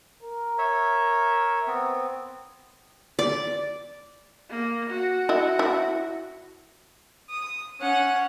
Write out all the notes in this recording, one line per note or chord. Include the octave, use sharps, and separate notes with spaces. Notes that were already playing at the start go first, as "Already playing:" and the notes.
A#4
C#5 E5
B3 C4
D5
A#3
F#4
E4 D#5
E4
D#6
C#4 F#5